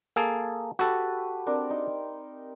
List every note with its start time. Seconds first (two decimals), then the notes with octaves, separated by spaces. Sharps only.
0.16 A#3 G#4 A4
0.79 F#4 G4 A4 B4
1.46 C4 D4 A#4
1.70 D#4